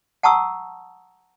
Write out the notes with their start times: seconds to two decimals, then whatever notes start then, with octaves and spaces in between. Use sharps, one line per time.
0.23 F#5 A5 A#5 C#6 D#6 E6